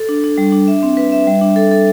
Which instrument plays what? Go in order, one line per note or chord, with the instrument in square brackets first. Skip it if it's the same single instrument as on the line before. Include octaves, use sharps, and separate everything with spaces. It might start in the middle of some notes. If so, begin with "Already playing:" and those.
Already playing: [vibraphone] A4
D4
D4
G3
D4
E5
C4
B4
E5
G3
D4
A4
A4